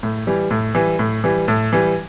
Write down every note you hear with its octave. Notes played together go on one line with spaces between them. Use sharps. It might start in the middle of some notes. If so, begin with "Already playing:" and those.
A2
E3 G3
A2
E3 G3
A2
E3 G3
A2
E3 G3